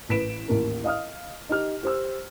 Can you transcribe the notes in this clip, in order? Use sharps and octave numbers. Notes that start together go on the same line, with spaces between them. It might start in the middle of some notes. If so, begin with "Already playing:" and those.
A1 B4 B6 D7 E7
A1 D#2 A#4
D#5 F5 D#6 F6
D#4 G4 F6
G4 C5 E6